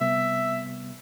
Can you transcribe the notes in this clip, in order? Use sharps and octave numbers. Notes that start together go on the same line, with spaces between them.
C3 G3 B3 E5